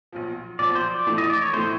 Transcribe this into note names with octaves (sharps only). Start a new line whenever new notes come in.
B1 A#2 F3
B1 A#2 F3 D5
C5
D5
A#1 A2 E3 A3
D#5
D5
C#5
A2 E3 A3 C5